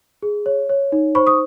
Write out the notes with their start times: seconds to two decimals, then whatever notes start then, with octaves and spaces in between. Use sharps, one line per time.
0.23 G#4
0.46 C#5
0.69 C#5
0.92 D#4
1.15 C5 B5 C#6
1.27 C#6 D#6